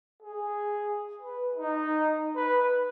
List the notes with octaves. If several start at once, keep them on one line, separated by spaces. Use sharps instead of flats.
G#4
B4
D#4
B4